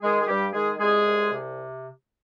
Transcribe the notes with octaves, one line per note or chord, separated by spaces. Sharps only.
D#3 G#3 G#4
G#4
G2 G3 G4
D#3 G#3 G#4
C2 G#3 G#4
C2
C3